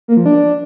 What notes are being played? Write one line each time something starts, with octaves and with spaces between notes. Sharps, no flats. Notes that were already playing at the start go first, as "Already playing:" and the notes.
A#3
F3
D4